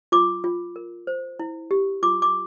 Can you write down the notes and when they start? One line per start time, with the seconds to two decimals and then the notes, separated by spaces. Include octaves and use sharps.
0.12 F4 D6
0.44 F4
0.76 A#4
1.07 C5
1.39 E4
1.71 G4
2.03 F4 D6
2.22 D6